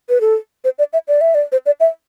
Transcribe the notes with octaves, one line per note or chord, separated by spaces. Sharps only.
B4
A4
C5
D5
E5
D5
E5
D5
C5
D5
E5